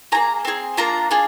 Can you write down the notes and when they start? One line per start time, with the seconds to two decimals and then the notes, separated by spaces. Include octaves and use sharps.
0.12 A#3 F4 G#4 A#5
0.45 C4 F4 G#4
0.77 A#3 D4 F4 A#5
1.11 D4 F4 G#4